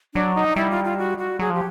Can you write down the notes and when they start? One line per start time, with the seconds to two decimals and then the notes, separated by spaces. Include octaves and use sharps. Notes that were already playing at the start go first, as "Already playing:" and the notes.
0.14 F#3 D4
0.35 D#4
0.56 G3 E4
0.70 F4
0.84 F4
0.98 F#4
1.18 F#4
1.39 F#3 G#4
1.50 F3 G4